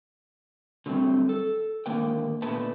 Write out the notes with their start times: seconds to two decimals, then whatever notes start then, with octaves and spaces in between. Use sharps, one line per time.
0.86 D3 F#3 G3 A3 C4
1.29 A4
1.86 G#2 D3 D#3 A#3 A#4 G5
2.42 A#2 D3 A3 B3 B4 A5